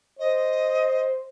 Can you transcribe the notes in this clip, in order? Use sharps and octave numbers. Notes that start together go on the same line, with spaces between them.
C5 D#5